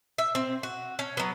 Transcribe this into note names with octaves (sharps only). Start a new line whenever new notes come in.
E5
C4
F#4
C#4
F#3 B3